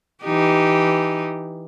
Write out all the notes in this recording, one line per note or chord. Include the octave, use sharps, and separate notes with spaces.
E3 D#4 G4